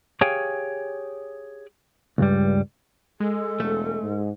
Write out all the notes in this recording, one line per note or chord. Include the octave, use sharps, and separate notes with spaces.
G4 G#4 C#5 F5 G5 G#5
C#2 G2 G3
G#3 A4
E1 A3
G#2